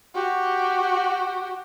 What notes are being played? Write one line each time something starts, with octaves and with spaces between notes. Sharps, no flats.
F#4 G4